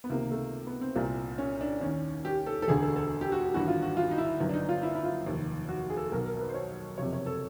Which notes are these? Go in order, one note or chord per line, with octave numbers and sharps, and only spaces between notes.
B3
C#2 C3 D#3 A#3
A3
B3
C4
C2 A#2
C#4
D4
D#2 D#3 C#4
G4
A4
A4
E1 D2 D3 G#4
A4
A4
G4
F#4
G4
G#1 G2 E3 F#4
F4
F#4
F4
D#4
E4
G1 F#2 D#3
D4
D#4
F4
E4
E4
F4
F1 D#2 D#3
F#4
G#4
A4
G#4
B1 B2 A#4
A#4
A#4
B4
C5
C#5
F#1 F2 C3 C#5
C#5
A4